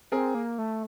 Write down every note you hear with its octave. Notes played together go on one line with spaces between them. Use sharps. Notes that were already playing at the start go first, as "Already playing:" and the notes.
C4 G#4 A#4
A#3
A3